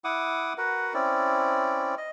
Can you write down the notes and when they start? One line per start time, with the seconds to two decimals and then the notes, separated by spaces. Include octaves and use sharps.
0.04 E4 F#5 D6 D#6
0.58 F#4 A#4 B4 F#5
0.94 C4 C#4 E4 D5
1.98 D#5